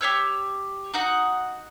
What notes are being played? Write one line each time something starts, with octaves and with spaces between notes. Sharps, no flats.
G4 B4 C#5 E6
D#4 F#4 F#5